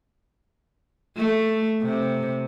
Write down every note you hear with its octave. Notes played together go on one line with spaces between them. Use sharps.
A3
C3